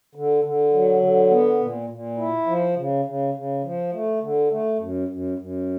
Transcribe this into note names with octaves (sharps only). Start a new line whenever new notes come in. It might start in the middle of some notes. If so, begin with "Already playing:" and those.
D3
D3
F#3
D3
B3
A#2
A#2
E4
F3
C#3
C#3
C#3
F3
A3
D3
A3
F#2
F#2
F#2